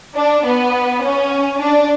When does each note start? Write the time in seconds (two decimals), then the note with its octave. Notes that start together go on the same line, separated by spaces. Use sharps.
0.16 D4
0.45 B3
1.03 C#4
1.60 D4